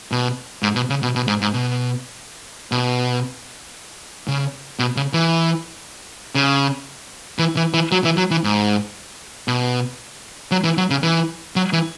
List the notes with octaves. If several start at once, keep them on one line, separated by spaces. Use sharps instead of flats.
B2
G#2
B2
C#3
B2
B2
G#2
G#2
B2
B2
C#3
B2
C#3
E3
C#3
E3
E3
E3
F#3
E3
F#3
E3
G#2
B2
F#3
E3
F#3
C#3
E3
F#3
E3